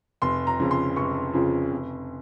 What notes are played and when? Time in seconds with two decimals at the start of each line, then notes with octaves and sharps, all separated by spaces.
0.22 F1 C6
0.47 A#5
0.59 F2 C#3 F3
0.71 C6
0.96 F1 C#6
1.34 F2 C#3 F3
1.72 F1